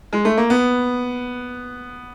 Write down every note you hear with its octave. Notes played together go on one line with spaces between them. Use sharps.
G#3
A3
A#3
B3